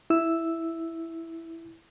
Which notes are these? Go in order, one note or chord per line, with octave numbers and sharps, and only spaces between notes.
E4 E6